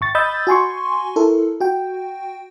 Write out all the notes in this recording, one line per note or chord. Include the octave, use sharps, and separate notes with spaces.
G#1 C#6 A6
D#5 B5 D#6 E6 G6 A6
F#4 G#5 C6 C#6
E4 A4 A#4
F#4 G5